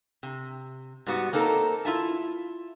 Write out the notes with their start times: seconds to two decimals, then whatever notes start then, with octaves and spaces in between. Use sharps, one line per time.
0.23 C3
1.07 G#2 G3 B3 F#4
1.33 A#3 C4 D#4 A4 A#4
1.85 E4 F4 E5 A5